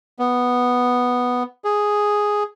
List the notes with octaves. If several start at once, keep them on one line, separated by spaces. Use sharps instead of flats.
B3
G#4